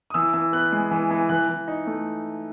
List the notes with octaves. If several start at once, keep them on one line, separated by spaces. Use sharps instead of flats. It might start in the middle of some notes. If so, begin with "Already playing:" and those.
D#6
E3 E6
E3 E6
B3 F#6
G#3
E3
E3
E3 F#6
E3
D#4
A3